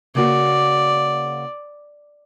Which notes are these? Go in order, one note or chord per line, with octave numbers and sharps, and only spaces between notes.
C#3 A#3 F#4 D5